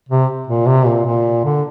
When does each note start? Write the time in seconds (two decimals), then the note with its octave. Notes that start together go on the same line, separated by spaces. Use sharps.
0.09 C3
0.47 A#2
0.67 C3
0.86 A#2
1.06 A#2
1.45 D3